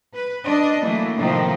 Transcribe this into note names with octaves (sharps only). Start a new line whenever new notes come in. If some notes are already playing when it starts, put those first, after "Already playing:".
B4
D4 D#5
E3 F#3 A3 A#3
A2 C3 D#3 F3 A3